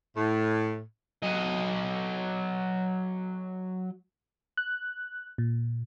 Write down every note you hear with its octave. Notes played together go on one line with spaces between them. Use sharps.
A2
F#3 D#5
F#6
A#2